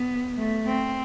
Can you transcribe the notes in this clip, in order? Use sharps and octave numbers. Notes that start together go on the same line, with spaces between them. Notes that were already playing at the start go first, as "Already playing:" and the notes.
Already playing: B3
A3
C4